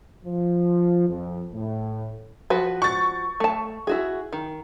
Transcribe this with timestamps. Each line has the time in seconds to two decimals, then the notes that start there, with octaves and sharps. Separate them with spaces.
0.25 F3
1.08 F2
1.53 A2
2.50 F3 F#4 B4
2.82 C#6 A6
3.40 A3 A5
3.87 E4 F#4 G#4
4.33 D#3